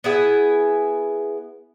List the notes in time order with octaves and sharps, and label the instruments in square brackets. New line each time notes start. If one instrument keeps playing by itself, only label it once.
[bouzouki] B3 E4 G#4